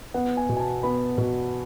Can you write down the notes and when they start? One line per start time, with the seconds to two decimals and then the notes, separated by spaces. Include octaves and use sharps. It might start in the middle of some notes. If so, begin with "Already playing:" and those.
0.14 B3 F#5
0.37 G#5
0.49 B2
0.57 G#5
0.60 A5
0.83 B3 B5
1.18 B2